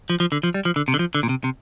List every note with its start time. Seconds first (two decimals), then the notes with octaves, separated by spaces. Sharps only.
0.10 F3
0.20 F3
0.32 D3
0.43 F3
0.54 G3
0.65 F3
0.76 D3
0.88 C3
0.94 D3
0.99 F3
1.15 D3
1.23 A#2
1.29 C3
1.44 C3